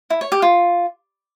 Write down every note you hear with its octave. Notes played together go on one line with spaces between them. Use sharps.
E4
C#5
G4
F4